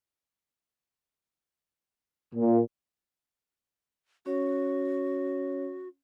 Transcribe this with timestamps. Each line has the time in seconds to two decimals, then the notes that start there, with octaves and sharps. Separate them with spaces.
2.34 A#2
4.26 C#4 F#4 C#5